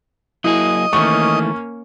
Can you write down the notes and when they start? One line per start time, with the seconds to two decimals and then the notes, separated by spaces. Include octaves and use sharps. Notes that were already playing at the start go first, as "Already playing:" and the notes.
0.44 F#3 A#3 E4 G#4 D#5
0.93 D#3 E3 A3 A#3 C#4 C#6